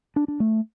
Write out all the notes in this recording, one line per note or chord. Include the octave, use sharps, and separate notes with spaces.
D4
D4
A3